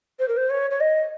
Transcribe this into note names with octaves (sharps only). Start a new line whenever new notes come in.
C5
A#4
C5
C#5
C#5
D#5